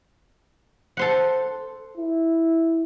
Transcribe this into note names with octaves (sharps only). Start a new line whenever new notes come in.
A4 C5 F#5
E4